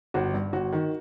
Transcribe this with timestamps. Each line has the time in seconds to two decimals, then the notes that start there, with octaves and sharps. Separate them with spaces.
0.14 G1 F#4
0.34 G2
0.53 G1 F#4
0.72 D#3